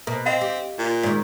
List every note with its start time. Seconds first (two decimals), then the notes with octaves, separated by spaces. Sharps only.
0.07 B2 A#3 A#4
0.26 C4 D#5 F5
0.41 G4
0.79 A#2
1.03 G#2 D#3 D5